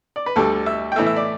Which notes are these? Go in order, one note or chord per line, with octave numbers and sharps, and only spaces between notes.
D5
B4
D2 D3 G3 A4
E5
G5
A2 E3 A3 E5
E5
D5